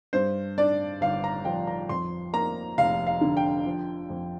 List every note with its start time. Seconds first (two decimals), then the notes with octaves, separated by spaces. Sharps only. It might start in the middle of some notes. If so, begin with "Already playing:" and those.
0.13 G2 C5
0.58 D4 D5
1.01 G1 F5
1.24 A#5
1.45 F3 G5
1.67 A#5
1.89 F2 C6
2.33 A#3 A#5
2.78 F1 F5
3.07 F5
3.21 D3
3.37 G5
3.66 F3
4.10 F2